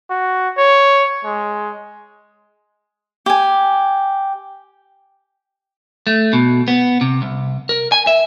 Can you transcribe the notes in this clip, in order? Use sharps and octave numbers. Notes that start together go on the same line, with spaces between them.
F#4
C#5
G#3
G4 G#5
A3
B2
B3
C3
C2
A#4
G#5
E5